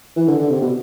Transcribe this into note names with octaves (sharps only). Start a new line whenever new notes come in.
E3
D3
D3
C3
B2